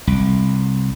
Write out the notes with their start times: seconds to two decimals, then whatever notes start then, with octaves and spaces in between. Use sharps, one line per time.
0.07 C2